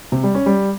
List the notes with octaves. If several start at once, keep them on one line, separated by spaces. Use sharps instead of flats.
C3
G3
C#4
G3